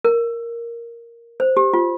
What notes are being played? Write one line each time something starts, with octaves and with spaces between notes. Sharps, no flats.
A#4
C5
G4
F4